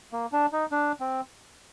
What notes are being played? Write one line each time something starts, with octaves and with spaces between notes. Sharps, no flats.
A#3
D4
D#4
D4
C4